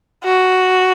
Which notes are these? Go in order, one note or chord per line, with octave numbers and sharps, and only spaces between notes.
F#4